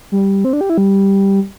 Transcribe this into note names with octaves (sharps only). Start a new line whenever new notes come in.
G3
C4
D4
G4
E4
G3